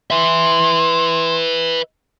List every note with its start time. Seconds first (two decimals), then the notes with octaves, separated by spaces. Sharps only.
0.11 B4 E5 C6